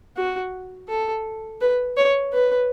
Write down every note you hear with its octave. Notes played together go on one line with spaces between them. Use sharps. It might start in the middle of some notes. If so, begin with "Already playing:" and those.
F#4
A4
B4
C#5
B4